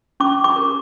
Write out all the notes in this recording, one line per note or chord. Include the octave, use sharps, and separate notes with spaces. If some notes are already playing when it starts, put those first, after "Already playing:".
C#4 D6
D6
G4 A#4